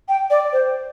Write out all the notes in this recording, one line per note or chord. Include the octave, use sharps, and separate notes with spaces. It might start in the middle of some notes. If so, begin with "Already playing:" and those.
G5
D5
C5